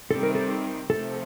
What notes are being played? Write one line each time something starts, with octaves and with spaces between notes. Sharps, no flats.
C3 D#3 G3 C4 A4
A#4
A4
C3 F3 A3 C4 A4